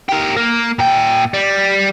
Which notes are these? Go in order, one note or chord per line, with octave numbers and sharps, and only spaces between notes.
G4 A#4
A#3
A#2 G5
G3